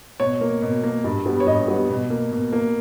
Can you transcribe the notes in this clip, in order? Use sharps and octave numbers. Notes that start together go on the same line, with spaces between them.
B2 C#5
A#3
B2
A#3
G2
G3 B3
C#5
G2 D#5
G3 B3
B2
A#3
B2
A#3